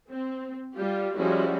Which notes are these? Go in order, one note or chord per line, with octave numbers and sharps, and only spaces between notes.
C4
G3 F4 G4
F3 G3 G#3 C#4 E4 F#4